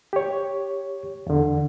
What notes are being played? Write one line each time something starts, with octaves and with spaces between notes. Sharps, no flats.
G4 C#5
E2 D3